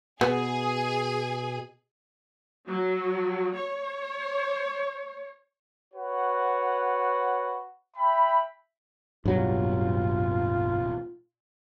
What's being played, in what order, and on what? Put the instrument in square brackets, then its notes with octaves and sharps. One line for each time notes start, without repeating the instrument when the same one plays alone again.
[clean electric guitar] B2 [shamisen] B3 [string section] G#4 G#5
[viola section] F#3
C#5
[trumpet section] F#4 B4 C#5 F#5
E5 G5 B5
[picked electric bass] D1 B2 [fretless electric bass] G2 F#3 [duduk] F4